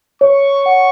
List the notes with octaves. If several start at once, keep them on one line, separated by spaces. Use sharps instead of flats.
C#5 C#6
F#5